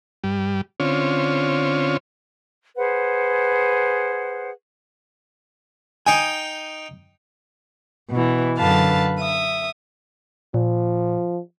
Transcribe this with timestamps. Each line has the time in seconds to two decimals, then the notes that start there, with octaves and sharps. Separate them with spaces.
0.24 G2 G3
0.80 D3 C4 C#4 F4 C#5
2.76 G#4 B4 C5 F#5
6.07 D#4 G5 G#5 D#6
8.11 B2 E3
8.58 F#2 D3 B4 F5 A5 A6
9.19 E5 D#6
10.54 A#2 F3